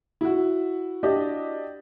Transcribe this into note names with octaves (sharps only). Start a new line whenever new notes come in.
E4 F#4
D4 G4 D#5